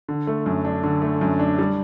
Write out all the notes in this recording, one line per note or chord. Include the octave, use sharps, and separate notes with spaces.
D3
A3
F#2
D4
D3
A3
F#2
D4
G3